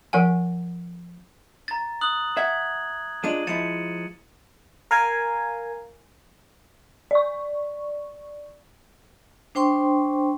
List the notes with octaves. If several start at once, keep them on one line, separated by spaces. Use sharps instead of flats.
F3 A#4 F#5 G#5
A#5 A6
D#6 F#6 F#7
E5 F#5 G#6
G#3 D4 F4 D#7 F#7
F3 G#3 E4 A6 C#7 E7
A#4 F5 G#5
D5 C#6
D4 C5 G5 C6 C#6